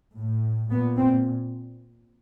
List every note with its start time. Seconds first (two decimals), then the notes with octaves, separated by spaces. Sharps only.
0.14 A2
0.71 A#2 B3
0.99 C4